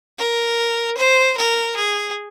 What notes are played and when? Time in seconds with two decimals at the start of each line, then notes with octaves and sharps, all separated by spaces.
0.19 A#4
0.97 C5
1.37 A#4
1.76 G#4